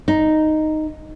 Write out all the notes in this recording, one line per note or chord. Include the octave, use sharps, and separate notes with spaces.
D#4